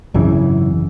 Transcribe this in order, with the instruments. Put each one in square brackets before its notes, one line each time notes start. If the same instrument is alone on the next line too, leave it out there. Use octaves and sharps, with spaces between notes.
[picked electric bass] G#1 F#2 C#3 E3